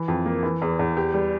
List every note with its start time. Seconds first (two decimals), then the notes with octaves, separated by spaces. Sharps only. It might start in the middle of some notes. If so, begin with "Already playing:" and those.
Already playing: E3
0.08 F2
0.26 A#3
0.43 E3
0.62 E2
0.79 E2
0.97 G4
1.14 G3